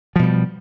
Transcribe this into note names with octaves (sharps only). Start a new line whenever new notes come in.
B2 F3 G3